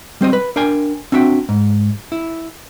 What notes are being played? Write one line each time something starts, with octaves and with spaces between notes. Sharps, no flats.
G3 C4 C5 D#5
B4
D4 A#4 F5 G5 G#5
C4 D4 F#4 E5 G5
G#2
E4